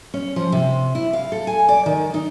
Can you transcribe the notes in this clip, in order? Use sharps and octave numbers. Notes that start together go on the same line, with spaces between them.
C#4
F3
C3
E4
F5
A4
G#5
D5
D#3
D#4